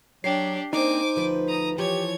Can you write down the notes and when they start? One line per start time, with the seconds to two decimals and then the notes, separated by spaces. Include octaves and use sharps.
0.24 F#3 D4 G4 C#5 G5 C7
0.73 A#3 C4 D4 D#4 C5 G#5 D6
1.16 D2 F3 B4
1.48 A#5 D#6
1.78 E3 F3 G4 C#5 G#6